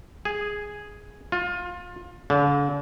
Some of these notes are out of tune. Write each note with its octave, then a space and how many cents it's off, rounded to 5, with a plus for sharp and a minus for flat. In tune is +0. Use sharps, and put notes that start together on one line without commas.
G#4 +0
F4 +25
D3 -45